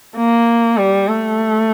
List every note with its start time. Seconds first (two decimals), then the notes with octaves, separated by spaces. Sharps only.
0.17 A#3
0.77 G3
1.08 A3